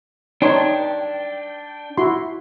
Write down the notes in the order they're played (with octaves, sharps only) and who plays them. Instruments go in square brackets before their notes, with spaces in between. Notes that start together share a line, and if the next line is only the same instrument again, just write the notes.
[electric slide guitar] D4 G5 [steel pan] D#4 C#5 C6
[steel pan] E4 F#4 C6